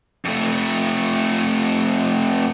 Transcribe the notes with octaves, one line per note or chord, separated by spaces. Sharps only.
F2 A3